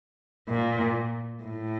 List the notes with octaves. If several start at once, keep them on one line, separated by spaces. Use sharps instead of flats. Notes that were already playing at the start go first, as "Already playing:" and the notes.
A#2
A2